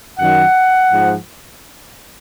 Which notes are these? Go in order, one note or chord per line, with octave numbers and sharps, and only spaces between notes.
F#2 D#3 F#3 F#5
G#2 F3